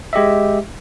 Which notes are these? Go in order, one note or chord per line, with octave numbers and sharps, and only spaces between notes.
G#3 G4 D#5 E5